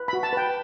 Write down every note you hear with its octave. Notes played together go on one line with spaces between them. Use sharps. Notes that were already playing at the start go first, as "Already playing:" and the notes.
Already playing: B4
F#4 B5
A5
B4 G5